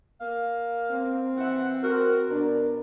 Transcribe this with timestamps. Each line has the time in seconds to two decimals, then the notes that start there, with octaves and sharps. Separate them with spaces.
0.20 A#3 F5
0.91 C4
1.37 E3 E5 F#5
1.83 F#4 A#4
2.30 B2 D4 A#4